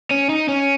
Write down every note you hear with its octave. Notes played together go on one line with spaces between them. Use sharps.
C#4
D#4
C#4